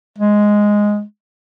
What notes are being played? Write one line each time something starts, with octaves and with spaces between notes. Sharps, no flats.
G#3